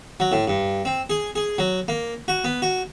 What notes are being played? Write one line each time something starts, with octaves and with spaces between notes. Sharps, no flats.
F#3
A2
G2
C4
G#4
G#4
F#3
A#3
F#4
B3
F#4